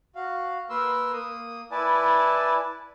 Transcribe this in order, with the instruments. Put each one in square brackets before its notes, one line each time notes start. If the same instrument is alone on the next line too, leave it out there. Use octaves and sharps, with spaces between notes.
[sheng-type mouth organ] F#4 F5
A#3 A#4 B4 C6 E6
A#3 D#6
E4 B4 D5 G#5 A5